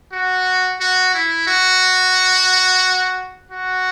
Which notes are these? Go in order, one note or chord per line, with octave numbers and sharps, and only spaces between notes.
F#4
F#4
E4
F#4
F#4